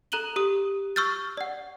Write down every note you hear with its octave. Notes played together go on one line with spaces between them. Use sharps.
A4 A#5 F#6 D#7 F#7 G7
G4 D#6
C#6 E6 F6 G6 A6
D5 F#5